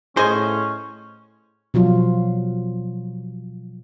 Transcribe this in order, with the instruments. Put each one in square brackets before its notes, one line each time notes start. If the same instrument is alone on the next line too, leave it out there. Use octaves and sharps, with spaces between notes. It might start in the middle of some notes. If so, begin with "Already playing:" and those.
[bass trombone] A2 [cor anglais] C#4 [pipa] G#4 D#5 C#6 [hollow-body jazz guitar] C5
[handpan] B2 F3 F#3 F4